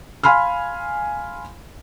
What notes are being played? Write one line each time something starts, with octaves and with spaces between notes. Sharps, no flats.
F5 G#5 B5 C6 F6